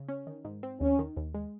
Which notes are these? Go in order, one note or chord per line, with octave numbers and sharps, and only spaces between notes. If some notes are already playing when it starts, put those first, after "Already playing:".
Already playing: C#3
C#4
D#3
G#2
C4
D#2 C#4
D#3
D#2
G#3